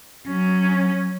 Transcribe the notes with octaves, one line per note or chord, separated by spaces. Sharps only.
F#3 C#4